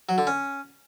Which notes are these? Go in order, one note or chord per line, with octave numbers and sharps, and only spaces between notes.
F#3
D3
C#4